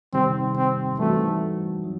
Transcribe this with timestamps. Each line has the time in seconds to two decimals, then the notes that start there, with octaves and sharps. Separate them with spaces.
0.13 C3 D#3 G3 C4 D#4 G4
0.56 C4
0.98 E3 G3 A3 C4 D#4 F#4
1.84 F#3